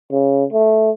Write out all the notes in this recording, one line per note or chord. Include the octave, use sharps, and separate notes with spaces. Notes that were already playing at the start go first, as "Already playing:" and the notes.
C#3
A3